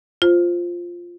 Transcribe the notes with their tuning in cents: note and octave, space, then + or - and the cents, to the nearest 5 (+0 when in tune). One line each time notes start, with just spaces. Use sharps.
F4 +0 C5 +0